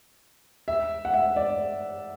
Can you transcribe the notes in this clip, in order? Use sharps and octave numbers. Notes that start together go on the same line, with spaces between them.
E5
F#5
E5
D5